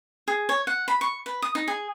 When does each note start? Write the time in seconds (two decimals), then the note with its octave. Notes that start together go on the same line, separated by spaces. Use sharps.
0.28 G#4
0.49 C#5
0.67 F#5
0.88 B5
1.01 C#6
1.26 B4
1.42 D#6
1.55 D#4
1.68 G#4